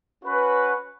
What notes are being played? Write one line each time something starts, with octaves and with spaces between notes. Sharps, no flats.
C#4 F#4 B4